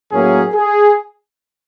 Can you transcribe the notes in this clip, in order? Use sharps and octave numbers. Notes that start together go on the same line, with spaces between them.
A2 F#3 A#3 C#4 G#4
G#4